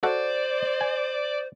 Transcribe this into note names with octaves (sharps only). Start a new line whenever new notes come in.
F#4 A4 C5 D5 F#5
G#5